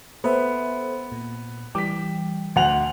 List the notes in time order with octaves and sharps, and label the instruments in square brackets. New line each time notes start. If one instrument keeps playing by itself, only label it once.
[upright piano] B3 [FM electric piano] A4 C5 E5
[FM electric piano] A#2
[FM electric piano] E3 G3 G5 [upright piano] D6 B6
[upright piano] D2 F#5 F7